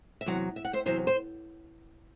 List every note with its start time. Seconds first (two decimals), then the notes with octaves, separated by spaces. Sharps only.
0.21 E5
0.26 E2 C3 F#3 F#5
0.56 E5
0.65 F#5
0.73 C5 E5
0.86 E2 C3 F#3 C5 E5
1.07 C5